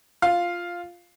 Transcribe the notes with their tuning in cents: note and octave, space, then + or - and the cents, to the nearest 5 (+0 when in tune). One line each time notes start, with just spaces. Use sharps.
F4 +0 F5 +0